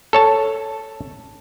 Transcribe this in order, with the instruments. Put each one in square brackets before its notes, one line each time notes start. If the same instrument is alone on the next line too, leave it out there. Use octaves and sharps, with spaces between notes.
[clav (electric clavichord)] A4 C#5 A5